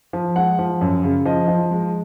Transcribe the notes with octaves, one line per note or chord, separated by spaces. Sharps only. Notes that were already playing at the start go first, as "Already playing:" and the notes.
F3
G#3 F#5
F3
F#2
C#3
F3 D#5
F3
G#3